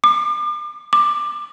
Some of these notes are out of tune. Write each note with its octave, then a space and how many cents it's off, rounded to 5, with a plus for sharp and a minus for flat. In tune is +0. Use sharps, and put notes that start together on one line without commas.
D6 +40
D6 +20